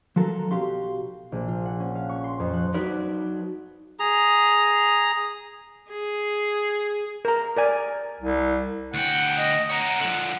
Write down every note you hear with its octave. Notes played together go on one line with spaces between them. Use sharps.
F3 F#3 A4 A#4
B1 F#4 G4 F5 C6
A#1
F4
F#5
C#4
F5
C#6
C6
F2
F#6
F#3 D#4 B4 D5
G#4 A#5
G#4
A#4 A#5
A#4 D5 G#5
C2
D2 F#5 G5
D#5
A#4 C#5 F#5
D3 F3